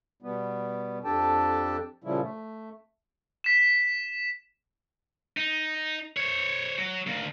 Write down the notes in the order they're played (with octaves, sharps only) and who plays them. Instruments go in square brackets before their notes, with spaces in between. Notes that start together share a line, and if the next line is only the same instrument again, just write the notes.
[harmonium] B2 G3 B3
F2 D4 G4 A4 G5 A5
A#2 C#3 F3 G3 E4
A3
[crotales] B6 E7
[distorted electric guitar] D#4
C5 C#5
F#3
D2 A#3